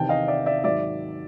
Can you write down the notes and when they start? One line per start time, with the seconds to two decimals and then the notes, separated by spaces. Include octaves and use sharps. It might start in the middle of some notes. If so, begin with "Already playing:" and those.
Already playing: E2 C3 D#3 G5 A5
0.09 D#5 F5
0.28 D5 E5
0.46 D5 E5
0.64 G#2 D#3 F#3 D5 E5